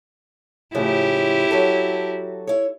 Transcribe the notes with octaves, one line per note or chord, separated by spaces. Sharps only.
A2 C#3 F3 E4 G4
F#3 F#4 A4
E4 C#5